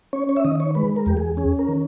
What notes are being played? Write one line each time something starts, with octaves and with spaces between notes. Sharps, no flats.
C#4 C#5
C#5
E5
D#3 D#5
C#5
G#3 B4
A#4
E2 G4
G#4
C#4 G#4
A#4
D#3